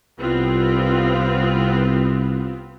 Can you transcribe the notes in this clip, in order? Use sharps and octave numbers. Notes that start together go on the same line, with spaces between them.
C2 B3 C4 F4